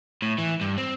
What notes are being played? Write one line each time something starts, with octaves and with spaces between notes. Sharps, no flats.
A2
E3
G2
C4